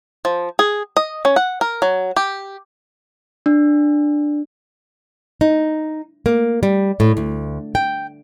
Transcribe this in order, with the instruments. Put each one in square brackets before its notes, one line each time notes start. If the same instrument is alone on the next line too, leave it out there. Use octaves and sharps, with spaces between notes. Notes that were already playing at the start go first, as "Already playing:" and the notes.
[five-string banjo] F3
G#4
D#5
C#4
F#5
A#4
F#3
G4
[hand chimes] D4
[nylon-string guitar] D#4
A#3
G3
A2
D2
G5